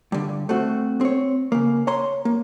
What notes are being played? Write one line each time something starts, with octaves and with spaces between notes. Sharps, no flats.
G2 D3
A3 C4 F#4
C4 C#5
C#3 A#3
C#5 A#5 C6
A#3